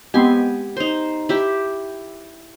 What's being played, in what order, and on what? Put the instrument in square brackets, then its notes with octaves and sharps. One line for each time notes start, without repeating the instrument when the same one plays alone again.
[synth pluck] G#3 B3 C4 [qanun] G4 G#5
[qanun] D#4 C5
E4 G4